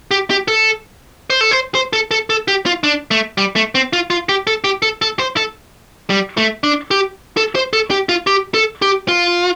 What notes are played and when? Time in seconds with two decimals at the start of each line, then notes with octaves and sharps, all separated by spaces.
0.11 G4
0.30 G4
0.48 A4
1.30 C5
1.41 A4
1.51 C5
1.75 C5
1.93 A4
2.11 A4
2.30 A4
2.48 G4
2.66 F4
2.84 D4
3.11 A3
3.38 G3
3.56 A3
3.75 C4
3.93 F4
4.10 F4
4.29 G4
4.47 A4
4.64 G4
4.82 A4
5.02 A4
5.19 C5
5.37 A4
6.10 G3
6.37 A3
6.64 D4
6.91 G4
7.37 A4
7.55 C5
7.73 A4
7.91 G4
8.09 F4
8.27 G4
8.54 A4
8.82 G4
9.08 F4